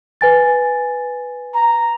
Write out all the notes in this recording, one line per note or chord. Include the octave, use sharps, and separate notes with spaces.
B4 G#5 A6
A#5